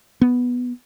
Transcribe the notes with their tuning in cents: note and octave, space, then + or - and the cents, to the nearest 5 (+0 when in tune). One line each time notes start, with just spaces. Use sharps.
B3 +0